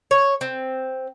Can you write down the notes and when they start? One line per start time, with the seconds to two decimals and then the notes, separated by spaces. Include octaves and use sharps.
0.11 C#5
0.41 C4